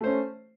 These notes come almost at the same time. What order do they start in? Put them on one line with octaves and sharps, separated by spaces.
A3 C5 C#4